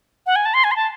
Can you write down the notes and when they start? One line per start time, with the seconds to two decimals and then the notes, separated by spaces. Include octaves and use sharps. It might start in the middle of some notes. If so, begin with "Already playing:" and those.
0.26 F#5
0.36 G#5
0.46 A5
0.54 C6
0.64 G#5
0.71 C6
0.76 A5